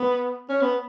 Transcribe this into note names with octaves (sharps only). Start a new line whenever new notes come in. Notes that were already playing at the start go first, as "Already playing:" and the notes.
Already playing: B3
C#4
B3